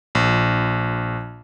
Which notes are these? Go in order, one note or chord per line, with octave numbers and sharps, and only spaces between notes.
A#1